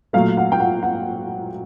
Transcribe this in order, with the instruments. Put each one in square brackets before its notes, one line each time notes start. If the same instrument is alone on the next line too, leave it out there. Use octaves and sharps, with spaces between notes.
[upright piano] A#2 F#3 A3 F5
F#5
G5
F#5
F#5